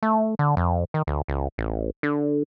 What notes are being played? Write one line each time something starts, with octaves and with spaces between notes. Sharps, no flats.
A3
D3
F2
D#3
D2
C#2
A1
D3